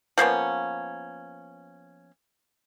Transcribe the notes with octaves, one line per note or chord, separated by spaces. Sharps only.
F3 A#3 B3 C#4